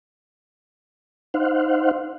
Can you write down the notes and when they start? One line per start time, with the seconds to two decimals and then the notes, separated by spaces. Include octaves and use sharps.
1.34 D#4 C5 F5 F#5